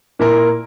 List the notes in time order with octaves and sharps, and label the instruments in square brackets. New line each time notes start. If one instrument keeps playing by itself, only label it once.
[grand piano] A#2 A#3 E4 A#4